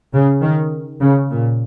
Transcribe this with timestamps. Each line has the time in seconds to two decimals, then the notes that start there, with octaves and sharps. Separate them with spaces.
0.13 C#3
0.42 D#3
1.01 C#3
1.30 A#2